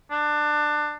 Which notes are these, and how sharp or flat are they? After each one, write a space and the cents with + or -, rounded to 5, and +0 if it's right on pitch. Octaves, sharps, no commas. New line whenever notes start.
D4 +20